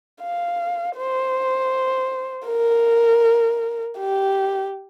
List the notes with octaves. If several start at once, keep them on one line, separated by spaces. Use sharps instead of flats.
F5
C5
A#4
G4